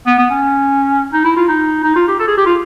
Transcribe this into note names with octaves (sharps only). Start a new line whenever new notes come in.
B3
B3
C#4
D#4
E4
F4
D#4
D#4
F4
G4
A4
G#4
G4
F4